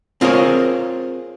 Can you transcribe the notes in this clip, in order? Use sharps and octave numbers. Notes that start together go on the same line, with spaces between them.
C4 F4 G#4 A#4 C#5